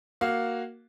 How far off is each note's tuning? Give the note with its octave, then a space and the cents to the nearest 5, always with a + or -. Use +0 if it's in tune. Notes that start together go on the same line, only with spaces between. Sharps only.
A#3 +0 F#4 +0 F5 +0